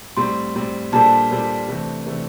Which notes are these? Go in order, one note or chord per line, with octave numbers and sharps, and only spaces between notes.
A2 G3 C4 C6
A2 G3 C4
A#2 G3 D4 A4 C5 A5
A#2 G3 D4 A4 C5
C3 E3 A3 D4
C3 E3 A3 D4